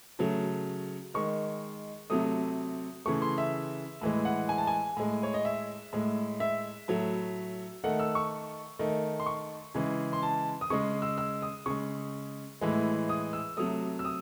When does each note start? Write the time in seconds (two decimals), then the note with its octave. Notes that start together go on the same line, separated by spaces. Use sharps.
0.19 C#3 F#3 A3
1.14 D#3 G#3 C#6
2.10 C3 F#3 A3 D#6
3.06 C#3 E3 A3 C#6
3.22 C6
3.38 E5
4.01 A2 E3 G#3
4.25 F#5
4.49 G#5
4.58 A5
4.67 G#5
4.97 A2 G#3
5.23 C#5
5.34 D#5
5.45 E5
5.93 A2 G#3
6.40 E5
6.88 A2 F#3 A3
7.84 D#3 A3 F#5
7.99 E6
8.15 C#6
8.79 D#3 A3
9.20 C6
9.26 C#6
9.75 C#3 E3 G#3
10.13 C6
10.23 A5
10.61 D#6
10.70 C#3 G#3 C#6
11.02 E6
11.18 E6
11.42 D#6
11.66 C#3 G#3 C#6
12.61 A2 E3 G#3
13.09 D#6
13.33 E6
13.57 C3 F#3 A3 D#6
13.99 E6
14.05 D#6